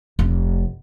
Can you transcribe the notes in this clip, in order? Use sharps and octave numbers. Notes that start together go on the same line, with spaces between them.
F1